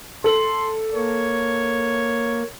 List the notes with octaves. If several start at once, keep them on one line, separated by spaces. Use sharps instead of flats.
A4 C6 F#7
A#3 C#5